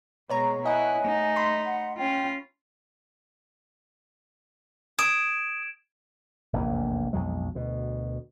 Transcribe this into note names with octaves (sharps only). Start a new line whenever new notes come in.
B2 G#3 B4 C#5 A#5
E4 D#5 F#5 G#5
A3 D#4
B5 C6
F#5
C#4 F4 G5
D#6 G#6 D7 E7
F1 A#1 E2 A#2
B1 F2 F#3 G#3
D2 B2